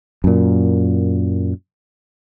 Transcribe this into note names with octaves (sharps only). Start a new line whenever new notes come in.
F#2 A#2